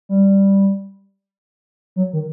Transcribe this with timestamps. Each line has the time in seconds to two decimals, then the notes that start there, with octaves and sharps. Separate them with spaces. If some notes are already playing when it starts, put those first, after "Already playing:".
0.09 G3
1.96 F#3
2.13 D#3